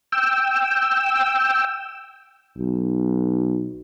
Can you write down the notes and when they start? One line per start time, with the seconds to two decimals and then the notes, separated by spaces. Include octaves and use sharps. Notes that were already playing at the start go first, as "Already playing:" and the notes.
0.12 G5 E6
2.58 B1